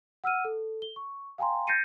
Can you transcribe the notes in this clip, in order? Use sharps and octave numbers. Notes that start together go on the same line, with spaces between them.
F#5 E6 F6 D#7
A4
G7
C#6
F5 G5 G#5 A#5 C6
G6 A6 A#6 C7 C#7 D#7